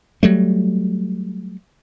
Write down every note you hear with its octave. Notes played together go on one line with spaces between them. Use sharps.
F#3 G3 A3